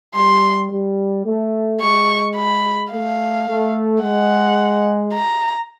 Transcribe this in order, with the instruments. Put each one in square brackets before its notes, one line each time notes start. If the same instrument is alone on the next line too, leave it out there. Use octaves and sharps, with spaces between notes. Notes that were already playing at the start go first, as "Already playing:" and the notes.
[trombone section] G3 [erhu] C6
[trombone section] G3
A3
[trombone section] G#3 [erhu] C#6
[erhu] B5
[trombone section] A3 [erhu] F5
[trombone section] A3
[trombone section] G#3 [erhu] F#5
[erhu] A#5